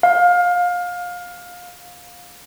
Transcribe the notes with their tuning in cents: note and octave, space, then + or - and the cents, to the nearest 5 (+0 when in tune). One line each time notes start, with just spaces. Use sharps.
F5 +25